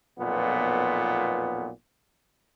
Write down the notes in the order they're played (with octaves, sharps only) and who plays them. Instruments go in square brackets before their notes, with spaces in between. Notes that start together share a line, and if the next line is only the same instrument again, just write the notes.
[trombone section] B1 F2 A#2 B3